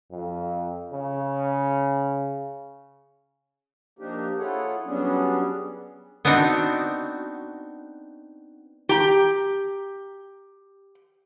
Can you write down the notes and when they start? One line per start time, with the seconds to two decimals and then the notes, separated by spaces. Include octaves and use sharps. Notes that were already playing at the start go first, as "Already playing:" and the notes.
0.12 F2
0.93 C#3
3.99 F3 A#3 D4 D#4 G4
4.38 E4 F4 G#4 A4 C#5 F#5
4.85 F#3 G3 B3 C#4 D4 G#4
6.25 B3 C4 D4 D#4 F#4
8.89 G4 A#5